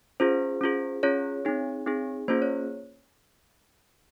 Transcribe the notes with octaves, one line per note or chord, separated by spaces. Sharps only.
C#4 F4 G#4 C5
C#4 F4 G#4
C#4 F4 G#4 C#5
C4 D#4 G#4
C4 D#4 G#4
A#3 C#4 F4 G#4 C5
C#5